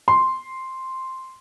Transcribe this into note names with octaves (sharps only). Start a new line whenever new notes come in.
C6